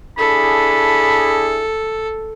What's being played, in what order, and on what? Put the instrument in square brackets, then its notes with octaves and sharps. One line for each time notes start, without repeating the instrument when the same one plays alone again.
[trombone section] D4 E4 G#4 [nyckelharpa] A4 [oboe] B5